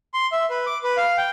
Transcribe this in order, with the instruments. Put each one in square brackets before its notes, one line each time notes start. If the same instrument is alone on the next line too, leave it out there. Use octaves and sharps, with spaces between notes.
[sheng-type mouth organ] C6
E5
B4
D6
B4
F5
G5